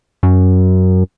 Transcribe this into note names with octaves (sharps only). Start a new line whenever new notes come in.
F#2